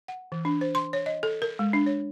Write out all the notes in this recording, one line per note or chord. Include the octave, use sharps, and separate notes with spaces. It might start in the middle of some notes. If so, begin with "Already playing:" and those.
F#5
E3
D4
C5
C6
C#5
D#5
A4
A#4
G#3
D4
C#5